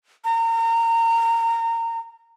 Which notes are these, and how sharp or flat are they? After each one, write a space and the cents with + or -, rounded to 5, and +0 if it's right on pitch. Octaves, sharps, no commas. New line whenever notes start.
A#5 -25